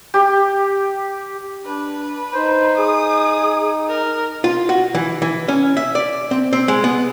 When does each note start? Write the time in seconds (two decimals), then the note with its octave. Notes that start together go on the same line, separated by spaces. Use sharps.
0.14 G4
1.65 D4 B4
2.35 D#4 C5
2.78 G#4 D#6
3.89 A#4
4.44 F4
4.69 F#4
4.95 E3
5.22 E3
5.48 C#4
5.77 E5
5.95 D5
6.31 C4
6.53 C4
6.68 G#3
6.84 B3